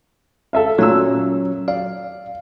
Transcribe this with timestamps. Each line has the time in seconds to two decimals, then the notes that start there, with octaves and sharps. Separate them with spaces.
0.53 A4 E5 F5
0.78 A#2 F#3 C#4 E6
1.68 D5 F5